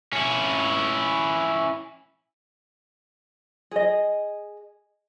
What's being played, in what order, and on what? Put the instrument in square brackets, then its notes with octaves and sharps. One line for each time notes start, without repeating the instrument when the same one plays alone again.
[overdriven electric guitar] C#4 E4
[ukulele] G#4 D#5